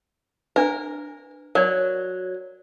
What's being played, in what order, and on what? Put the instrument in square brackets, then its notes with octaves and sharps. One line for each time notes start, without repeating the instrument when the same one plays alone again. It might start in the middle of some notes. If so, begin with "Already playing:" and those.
[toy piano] D4 B4 [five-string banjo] A#4
[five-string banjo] F#3 [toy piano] A#4 D5